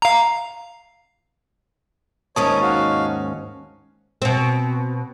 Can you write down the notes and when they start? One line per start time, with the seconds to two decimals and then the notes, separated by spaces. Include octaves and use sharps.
0.02 F5 A#5
2.36 D#2 G#2 C#4 C#5 A5 C#6 D#6
2.62 F#4 F5
4.22 B2 C4